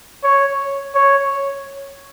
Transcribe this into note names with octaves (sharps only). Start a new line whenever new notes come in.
C#5
C#5